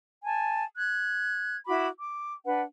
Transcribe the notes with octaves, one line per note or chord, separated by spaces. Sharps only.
G#5 A5
F#6 G#6
E4 F#4 B5 D6
D6
D4 B4 F#5